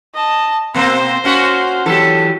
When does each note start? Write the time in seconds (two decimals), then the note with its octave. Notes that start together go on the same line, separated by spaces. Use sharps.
0.14 D#5 A5
0.74 B2 A#3 C4 C5
1.24 A#3 C#4 F#4
1.86 E3 F#3 G4 A4